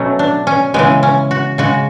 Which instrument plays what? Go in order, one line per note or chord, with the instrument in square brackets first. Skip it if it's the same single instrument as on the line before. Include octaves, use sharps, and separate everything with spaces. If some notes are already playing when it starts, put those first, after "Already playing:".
Already playing: [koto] B2 F#3 A3 C#4
D4
C#4
C#3 E3 G#3 B3
C#4
F#4
C#3 G#3 F#4